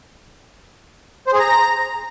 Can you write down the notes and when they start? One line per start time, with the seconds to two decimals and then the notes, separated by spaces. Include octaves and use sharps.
1.27 C5
1.33 G#4
1.39 A#5